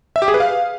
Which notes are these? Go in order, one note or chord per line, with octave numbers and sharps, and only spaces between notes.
E5
G4
G#4
B4
F5